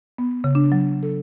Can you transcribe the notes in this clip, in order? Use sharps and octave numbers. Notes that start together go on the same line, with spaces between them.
B3
C#3
D4
F#3
A4